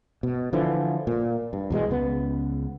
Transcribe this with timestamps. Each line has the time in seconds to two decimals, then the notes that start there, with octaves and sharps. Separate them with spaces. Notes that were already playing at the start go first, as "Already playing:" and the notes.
0.23 B2
0.53 D3 E3 F3
1.07 A#2
1.53 G2
1.71 E2 B2 G3 G#3
1.91 C#2 B3